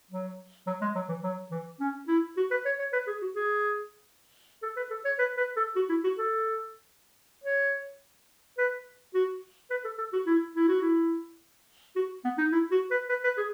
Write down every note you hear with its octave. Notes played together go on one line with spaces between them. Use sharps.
F#3
F#3
G#3
F#3
E3
F#3
E3
C#4
E4
F#4
B4
C#5
C#5
B4
G#4
F#4
G#4
A4
B4
A4
C#5
B4
B4
A4
F#4
E4
F#4
A4
C#5
B4
F#4
B4
A4
A4
F#4
E4
E4
F#4
E4
F#4
B3
D#4
E4
F#4
B4
B4
B4
G#4